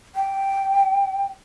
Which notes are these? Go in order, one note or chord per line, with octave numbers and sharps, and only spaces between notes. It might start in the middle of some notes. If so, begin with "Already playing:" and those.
G5